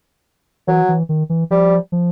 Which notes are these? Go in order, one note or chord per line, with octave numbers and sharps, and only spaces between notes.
E3 F#3
E3
D#3
E3
F3 G3
F3